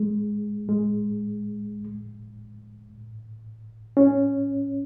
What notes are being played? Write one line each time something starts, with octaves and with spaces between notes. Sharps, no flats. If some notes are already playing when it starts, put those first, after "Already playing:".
Already playing: G#3
G#3
C#4